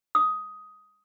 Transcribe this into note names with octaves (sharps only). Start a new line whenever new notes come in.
D#6